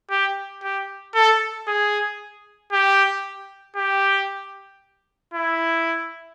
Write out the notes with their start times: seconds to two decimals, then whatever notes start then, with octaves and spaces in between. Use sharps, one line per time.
0.10 G4
0.63 G4
1.15 A4
1.67 G#4
2.72 G4
3.76 G4
5.34 E4